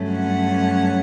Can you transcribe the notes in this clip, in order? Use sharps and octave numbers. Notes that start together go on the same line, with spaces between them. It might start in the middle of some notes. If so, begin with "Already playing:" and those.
Already playing: G2 D3 F#3 A3 C#4
F#5